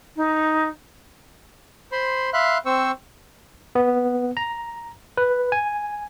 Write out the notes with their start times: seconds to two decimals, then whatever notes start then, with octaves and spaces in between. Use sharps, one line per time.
0.16 D#4
1.92 C5 B5 C6
2.33 E5 F5 B5 C6 F#6
2.66 C4 C5 C#6 E6
3.75 B3
4.37 A#5
5.17 B4
5.52 G#5